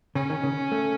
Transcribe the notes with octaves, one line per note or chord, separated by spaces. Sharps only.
C#3 C#4
D#3
C#3
A3